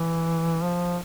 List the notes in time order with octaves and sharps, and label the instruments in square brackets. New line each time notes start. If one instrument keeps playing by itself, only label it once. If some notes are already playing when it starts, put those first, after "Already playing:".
Already playing: [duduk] E3
F3